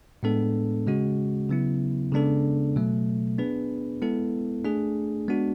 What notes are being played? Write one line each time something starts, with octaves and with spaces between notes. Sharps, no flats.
A2 G#3 B3 D4 A4
C#3 G#3 C#4 F#4
C#3 F#3 B3 E4
C#3 G#3 B3 D4 A4
B2 F#3 A3
B3 D4 G#4 B4
G#3 B3 E4 A4
A3 D4 G#4
G#3 B3 D4 F#4